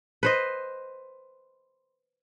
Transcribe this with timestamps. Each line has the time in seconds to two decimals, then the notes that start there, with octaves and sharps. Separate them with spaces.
0.23 B4 C5 D#5